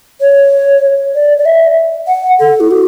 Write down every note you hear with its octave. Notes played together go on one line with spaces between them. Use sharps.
C#5
D5
D5
E5
F#5
A4
E4
F#4